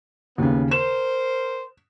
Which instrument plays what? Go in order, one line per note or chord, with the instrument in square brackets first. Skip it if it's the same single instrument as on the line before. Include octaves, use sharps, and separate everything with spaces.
[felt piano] D#2 C#3 [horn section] A#2 E3 B3
[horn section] A#4 C5 [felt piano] E7